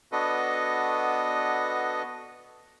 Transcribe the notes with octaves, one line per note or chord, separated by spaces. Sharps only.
B3 D4 F#4 A4 B4 D#5